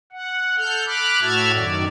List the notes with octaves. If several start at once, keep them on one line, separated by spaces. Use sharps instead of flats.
F#5
A4 F6 G6
B5 D6 F6 F#6
A2 F#4 E5 A5 F6 G#6
F#2 D#3 D5